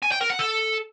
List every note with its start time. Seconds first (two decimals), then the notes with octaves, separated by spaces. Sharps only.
0.02 G#5
0.12 G5
0.21 A#4
0.30 F#5
0.39 A4